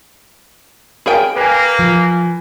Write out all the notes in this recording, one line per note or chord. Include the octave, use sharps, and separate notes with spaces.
G#4 A#4 G5
A#3 B4 G#5
F3